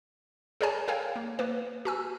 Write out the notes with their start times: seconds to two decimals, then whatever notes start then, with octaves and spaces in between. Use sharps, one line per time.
0.61 G#4 A#4 C#5 D5 G#5 A5
0.88 A4 A#4 C#5 F5 G5 G#5
1.16 A#3
1.39 A#3 B4
1.85 F#4 G#5 E6